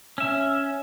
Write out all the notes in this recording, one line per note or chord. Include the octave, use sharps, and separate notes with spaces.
C#4 E5